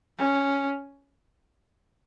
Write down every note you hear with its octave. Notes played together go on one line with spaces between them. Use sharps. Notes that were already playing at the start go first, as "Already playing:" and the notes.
C#4